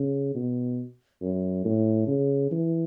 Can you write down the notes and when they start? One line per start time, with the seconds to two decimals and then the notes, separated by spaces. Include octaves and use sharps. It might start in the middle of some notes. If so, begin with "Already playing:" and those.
Already playing: C#3
0.35 B2
1.22 F#2
1.65 A2
2.07 C#3
2.51 E3